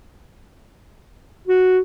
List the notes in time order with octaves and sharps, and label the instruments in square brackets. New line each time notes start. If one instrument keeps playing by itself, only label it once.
[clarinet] F#4